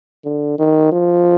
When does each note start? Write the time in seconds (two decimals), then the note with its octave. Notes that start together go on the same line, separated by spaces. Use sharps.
0.25 D3
0.59 D#3
0.92 F3